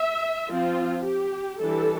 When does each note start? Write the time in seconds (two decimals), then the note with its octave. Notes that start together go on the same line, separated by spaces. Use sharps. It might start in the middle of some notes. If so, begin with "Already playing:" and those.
Already playing: E5
0.48 F3 C4 F4
1.04 G4
1.59 E3 G3 D4 A4